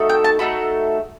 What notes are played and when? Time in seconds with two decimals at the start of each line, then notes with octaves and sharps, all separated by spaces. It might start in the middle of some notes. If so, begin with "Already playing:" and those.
Already playing: A3 D#4 F#4 A4
0.09 G5
0.24 A5
0.39 A3 D#4 F#4 A4 B5